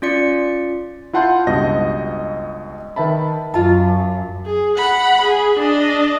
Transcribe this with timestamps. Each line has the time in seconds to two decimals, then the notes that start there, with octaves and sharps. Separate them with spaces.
0.02 C#4 F4 D5 C#7
1.13 E4 F4 F#5 A5 C6 G6
1.47 C#2 G2 B2 D#5 A#6
2.96 D#3 B4 E5 A5 B5
3.54 F#2 F4 A5
4.46 G#4
4.78 F#5 B5
5.22 G#4
5.59 D4 D#5